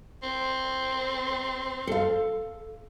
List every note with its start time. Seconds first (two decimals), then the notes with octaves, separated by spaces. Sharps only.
0.23 C4
1.87 A4 F5